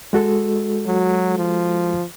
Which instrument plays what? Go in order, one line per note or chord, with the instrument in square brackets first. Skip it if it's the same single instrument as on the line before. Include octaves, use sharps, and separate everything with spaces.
[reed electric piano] G#3 F#4 A4
[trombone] F#3
F3